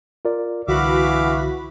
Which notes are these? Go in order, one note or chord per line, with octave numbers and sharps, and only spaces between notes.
F4 A#4 D5
C2 D3 E3 F#4 E5 F5 B5 D6